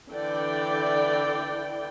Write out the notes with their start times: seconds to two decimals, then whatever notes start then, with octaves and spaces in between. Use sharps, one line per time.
0.11 D3 E3 D5 G5